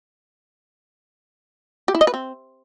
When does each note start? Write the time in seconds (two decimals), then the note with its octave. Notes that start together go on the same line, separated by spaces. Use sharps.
1.88 G4
1.95 E4
2.01 D#5
2.07 B4
2.14 C4